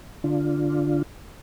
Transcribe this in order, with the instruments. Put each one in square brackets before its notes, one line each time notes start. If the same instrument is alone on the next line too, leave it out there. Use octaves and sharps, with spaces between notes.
[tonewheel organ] D3 D4 F4